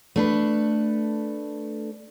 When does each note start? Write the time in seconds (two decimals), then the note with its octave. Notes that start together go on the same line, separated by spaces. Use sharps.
0.16 A3 D4 B4